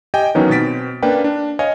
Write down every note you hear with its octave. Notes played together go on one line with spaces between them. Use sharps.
G4 D#5 G5 G#5
D#3 E3 F#3 B3 C#4 D#4
B2 C4 A6 B6 D7
A#3 C#4 D4 B4 D5 G5
D4
C#5 D#5 F5 G#5